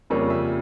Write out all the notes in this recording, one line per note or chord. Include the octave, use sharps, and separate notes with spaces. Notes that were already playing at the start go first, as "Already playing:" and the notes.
F2 C#3 G3 A#3 C#5
E5